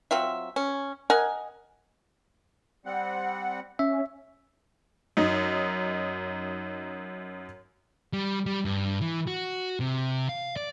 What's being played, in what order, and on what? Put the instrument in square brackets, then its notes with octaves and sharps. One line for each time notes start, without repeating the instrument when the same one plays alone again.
[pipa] F#3 C4 F4 E5
C#4
A#4 D#5 F#5 G#5
[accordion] G3 C4 F#5
[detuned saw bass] C#4 [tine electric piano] E5
[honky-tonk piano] F#2 D#4
[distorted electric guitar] G3
G3
G2
E3
F#4
C3
F5
D5